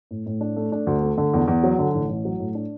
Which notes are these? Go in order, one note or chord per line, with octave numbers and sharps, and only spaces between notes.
A2
A2
D4
A3
D4
D2
A3
D3
E2
E2
F#3
D3
A1
A1
F#3
A2
D4